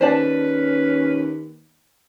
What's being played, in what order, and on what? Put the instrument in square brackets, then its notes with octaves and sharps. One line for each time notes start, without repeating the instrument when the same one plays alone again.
[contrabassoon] D#2 [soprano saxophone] C#4 [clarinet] B4 [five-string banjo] C5 D5 A5